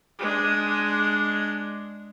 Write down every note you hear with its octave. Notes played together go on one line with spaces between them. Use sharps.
G#3 D4